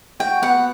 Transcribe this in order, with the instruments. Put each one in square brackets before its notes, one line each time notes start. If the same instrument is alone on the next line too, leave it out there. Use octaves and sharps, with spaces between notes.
[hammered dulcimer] F#4 [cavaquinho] G5
[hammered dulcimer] B3 [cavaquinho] F#5